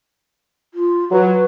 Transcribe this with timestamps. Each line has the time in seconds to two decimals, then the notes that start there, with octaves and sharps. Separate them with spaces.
0.74 F4
1.11 F#3 B4